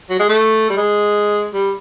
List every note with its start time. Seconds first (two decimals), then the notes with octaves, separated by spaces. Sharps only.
0.09 F#3
0.19 G#3
0.29 A3
0.69 G3
0.77 G#3
1.54 G3